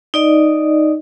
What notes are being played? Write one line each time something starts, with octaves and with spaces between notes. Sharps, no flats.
D#4 D5 D#5